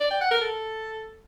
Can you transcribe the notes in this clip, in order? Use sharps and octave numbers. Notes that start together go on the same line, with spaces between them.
D5
G5
F#5
A#4
A4